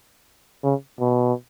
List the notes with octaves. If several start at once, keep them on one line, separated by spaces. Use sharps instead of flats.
C#3
B2